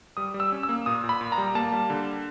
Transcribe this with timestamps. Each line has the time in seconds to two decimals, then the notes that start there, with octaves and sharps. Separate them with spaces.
0.17 G3 D#6
0.34 G3
0.40 E6
0.52 C#4
0.63 E6
0.69 A#3
0.86 A#2 D#6
1.04 A#2
1.09 B5
1.21 A#2
1.32 A#5
1.38 G3
1.55 A#3 A5
1.72 G3
1.90 D3